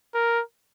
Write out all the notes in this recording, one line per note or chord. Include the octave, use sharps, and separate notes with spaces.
A#4